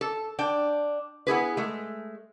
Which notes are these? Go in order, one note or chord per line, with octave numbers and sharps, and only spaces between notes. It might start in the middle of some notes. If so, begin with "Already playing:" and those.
A4
D4 G5
B3 E4 G#4 B4
G#3 A3